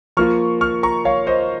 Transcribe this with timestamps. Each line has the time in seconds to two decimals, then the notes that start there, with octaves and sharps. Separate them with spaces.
0.17 F3 A#3 F4 C#6 F6
0.61 C#6 F6
0.83 A#5 C#6
1.05 C#5 F5
1.27 C5 D#5